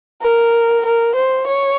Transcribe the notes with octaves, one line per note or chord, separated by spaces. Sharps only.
A#4
A#4
C5
C#5